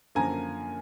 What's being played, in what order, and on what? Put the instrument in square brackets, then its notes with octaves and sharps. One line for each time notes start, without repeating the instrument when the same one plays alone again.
[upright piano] F#2 D3 F3 A#3 G#5 A#5